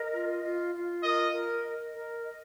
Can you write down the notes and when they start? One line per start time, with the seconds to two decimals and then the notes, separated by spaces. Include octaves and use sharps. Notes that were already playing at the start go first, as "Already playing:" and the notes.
Already playing: A#4 D#5
0.14 F4
0.43 F4
0.73 F4
1.03 A#4 D#5
1.33 A#4
1.63 D#5
1.93 A#4
2.23 D#5